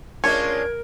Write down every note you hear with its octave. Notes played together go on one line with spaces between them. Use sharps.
G#3 C#4 D4 F4 A#4 C#5 G#6